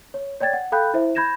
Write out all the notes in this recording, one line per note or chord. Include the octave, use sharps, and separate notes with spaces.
C#5
C#5 D5 G5 G#6 A6
F#5
A4 F5 G5 B5 F#6 G6
E4 C5 E5
B5 G6 G#6 A#6 E7